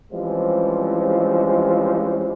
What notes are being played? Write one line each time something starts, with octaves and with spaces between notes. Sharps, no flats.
E3 F3 G3 G#3 C4 C#4